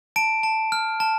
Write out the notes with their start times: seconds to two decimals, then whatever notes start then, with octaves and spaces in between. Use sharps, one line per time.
0.16 A5 D7
0.43 A5
0.72 F6
1.00 A5